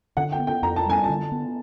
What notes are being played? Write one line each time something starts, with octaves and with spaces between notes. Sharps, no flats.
D3 F#5
G5
B3
G5
F2 A#5
A5
G3 G#5
A5
D3
B3